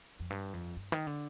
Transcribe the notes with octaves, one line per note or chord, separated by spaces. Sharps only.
F2
G2
F2
G2
D#3
D3